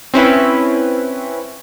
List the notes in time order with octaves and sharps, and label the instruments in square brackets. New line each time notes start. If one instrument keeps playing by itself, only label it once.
[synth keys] C4 C#4 E4 B4